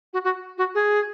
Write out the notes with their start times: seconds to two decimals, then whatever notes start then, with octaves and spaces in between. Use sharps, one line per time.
0.13 F#4
0.24 F#4
0.58 F#4
0.75 G#4